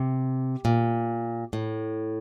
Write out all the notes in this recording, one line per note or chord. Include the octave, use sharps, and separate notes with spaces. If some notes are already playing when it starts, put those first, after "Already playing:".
Already playing: C3
A#2
A2